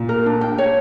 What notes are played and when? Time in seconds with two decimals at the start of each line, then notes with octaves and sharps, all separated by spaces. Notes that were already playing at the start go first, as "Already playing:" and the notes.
Already playing: A#2
0.09 A#4
0.26 D4
0.41 G5
0.58 C#5